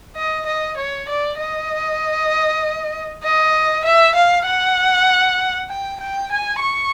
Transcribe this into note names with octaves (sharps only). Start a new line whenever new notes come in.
D#5
D#5
C#5
D5
D#5
D#5
E5
F5
F#5
G5
G5
G#5
C#6